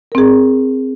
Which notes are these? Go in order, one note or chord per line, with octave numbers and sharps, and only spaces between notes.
C4 G#4 A#4